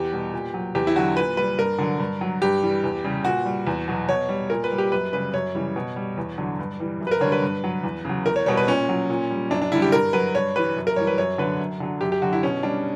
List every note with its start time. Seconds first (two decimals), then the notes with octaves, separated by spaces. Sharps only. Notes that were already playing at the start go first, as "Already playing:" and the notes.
Already playing: E2 G4
0.12 B2 G3
0.33 A#2
0.54 F#3
0.75 E2 G4
0.87 E4
0.95 D3 F#3 F#4
1.16 A#2 B4
1.37 G3 B4
1.58 G2 A#4
1.78 D3 F#3
1.99 G2
2.21 F#3
2.42 G2 G4
2.63 E3 G3
2.84 E2
3.04 C#3 G3
3.25 A#2 F#4
3.46 G3
3.67 E2
3.88 B2 F#3
4.09 B2 C#5
4.29 G3
4.50 A#2 A#4
4.64 B4
4.72 G3
4.78 G4
4.92 F#2 B4
5.13 C#3 G3 B4
5.34 F#2 C#5
5.55 C#3 E3 G3
5.76 B2
5.96 G3
6.18 E2
6.38 D3 F#3
6.59 G2
6.80 E3 G3
7.00 F#2
7.07 B4
7.11 A#4
7.21 D3 C#5
7.25 G3
7.32 B4
7.42 G2
7.64 F#3
7.83 E2
8.05 C#3 F#3
8.26 E2 A#4
8.36 C#5
8.46 B2 G3 C#5
8.57 B4
8.68 A#2 C#4
8.89 F#3
9.10 A#2
9.31 G3
9.50 F#2 D4
9.62 D4
9.72 D3 G3 E4
9.82 G4
9.92 G2 A#4
10.13 F#3 B4
10.35 G2 C#5
10.55 E3 G3 B4
10.76 F#2
10.87 A#4
10.96 E3 G3 C#5
11.07 B4
11.18 F#2 C#5
11.38 D3 F#3 B4
11.60 F#2
11.80 D3 F#3
12.01 F#2 G4
12.12 G4
12.22 D3 F#3 F#4
12.33 E4
12.43 B2 C#4
12.63 G3 D4